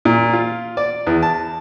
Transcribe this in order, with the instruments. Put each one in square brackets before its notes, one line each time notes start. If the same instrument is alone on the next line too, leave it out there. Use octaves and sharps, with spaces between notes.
[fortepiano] A#2
F4
D5
E2
A5